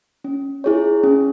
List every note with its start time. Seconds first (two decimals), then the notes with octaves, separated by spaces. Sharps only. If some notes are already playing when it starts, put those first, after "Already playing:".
0.24 C#4
0.64 E4 G#4 C#5
1.04 C#4